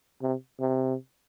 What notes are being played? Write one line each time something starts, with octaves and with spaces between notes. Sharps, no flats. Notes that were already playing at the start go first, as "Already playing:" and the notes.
C3
C3